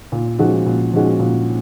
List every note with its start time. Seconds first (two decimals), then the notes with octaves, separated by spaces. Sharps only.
0.12 A#2
0.38 F3 G#3 C#4 F#4
0.66 A#2
0.93 F3 G#3 C#4 F#4
1.20 A#2